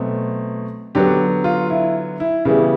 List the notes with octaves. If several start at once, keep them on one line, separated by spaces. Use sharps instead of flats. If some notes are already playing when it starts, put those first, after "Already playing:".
Already playing: B2 F#3 A3 C4
D3 F#3 B3 G4
F4
E4
E4
C#3 E3 G3 B3 E4